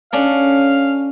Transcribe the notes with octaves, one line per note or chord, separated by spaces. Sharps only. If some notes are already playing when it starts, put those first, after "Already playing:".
C#4 D4 A4 F5